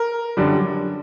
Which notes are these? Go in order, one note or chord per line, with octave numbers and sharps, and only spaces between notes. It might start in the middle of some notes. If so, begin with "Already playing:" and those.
Already playing: A#4
F#2 D3 G3